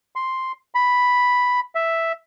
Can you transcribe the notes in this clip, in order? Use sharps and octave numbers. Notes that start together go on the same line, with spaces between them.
C6
B5
E5